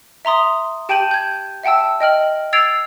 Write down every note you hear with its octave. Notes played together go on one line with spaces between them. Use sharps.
E5 A#5 C6 D#6
G4 G5 A5 G6 D#7 F#7
G6 G#6
E5 F#5 G5 A5 E6
D#5 G5 F6 F#7
E6 G#6 A6 C7 D7 F7